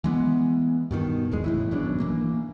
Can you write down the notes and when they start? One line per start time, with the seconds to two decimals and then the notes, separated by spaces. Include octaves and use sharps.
0.04 E3 G#3 B3
0.91 G2 B2 D#3
1.31 G#1 E2 G#3
1.44 F#1 A2 E3
1.71 G#1 F#2 B2 D4
2.00 E3 A#3